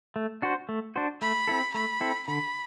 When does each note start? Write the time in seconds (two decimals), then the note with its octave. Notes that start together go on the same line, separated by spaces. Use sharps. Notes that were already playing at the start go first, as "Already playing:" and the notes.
0.16 A3
0.42 D4 F#4 C5
0.69 A3
0.96 D4 F#4 C5
1.22 A3 B5
1.47 C4 E4 A4
1.74 A3 B5
2.01 C4 E4 A4
2.27 D3 B5